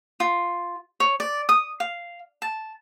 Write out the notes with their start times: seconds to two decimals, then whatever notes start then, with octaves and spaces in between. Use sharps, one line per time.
0.20 F4
1.00 C#5
1.20 D5
1.49 D#6
1.80 F5
2.42 A5